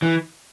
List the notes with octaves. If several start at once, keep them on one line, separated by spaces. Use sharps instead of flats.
E3